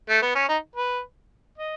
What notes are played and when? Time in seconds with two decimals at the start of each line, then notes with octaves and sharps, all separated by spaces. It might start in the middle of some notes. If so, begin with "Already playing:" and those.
0.09 A3
0.22 B3
0.35 C#4
0.49 D#4
0.76 B4
1.58 D#5